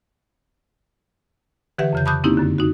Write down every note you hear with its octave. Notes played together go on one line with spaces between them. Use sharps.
D3 E3 G4 B4 E5 F#5
F2 C#3 G6
A5 B5 D6 D#6 F#6 G6
A#3 C4 C#4 D#4 E4 G4
F#2 D3
D#4 F#4